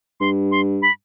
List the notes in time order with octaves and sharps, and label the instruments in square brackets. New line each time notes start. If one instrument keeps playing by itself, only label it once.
[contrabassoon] G2 [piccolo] C6
[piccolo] C6
B5